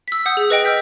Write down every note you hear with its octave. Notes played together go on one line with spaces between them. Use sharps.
E6 B6
F#5 D#6 G6
G#4
B4 D#5 G5
E6 F6 G6 B6